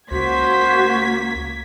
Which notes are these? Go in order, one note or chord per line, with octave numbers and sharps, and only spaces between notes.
C#2 A#3 F#4 C5 G#6 B6